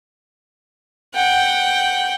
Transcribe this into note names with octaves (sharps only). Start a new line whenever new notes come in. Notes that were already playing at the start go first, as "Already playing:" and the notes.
F#5 G5